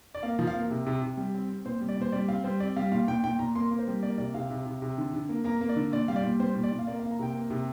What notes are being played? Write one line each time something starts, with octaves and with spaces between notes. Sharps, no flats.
D5
A#3 F5
F3
F5
A#3
C3
C3
C3
G3
C4
C4
A#2 C5
G3
D5
A#2 C5
G3 D5
C4 F5
G3 C5
C4 D5
G3 F5
A#2 F5
A#2 G5
A#2 G5
A#2 A#5
A#3 C6
A#3
C5
G3
A#3 D5
C3 D5
C3 F5
C3
C3
C3
D3
D3
A#3
A#3 A#5
A#3
D5
D3
A#2 D5
G3 F5
D5
A#2
G3 C5
A#2
D5
A#2
F5
A#3 D5
F5
A#3
A#5
C3 G5
A#3
C3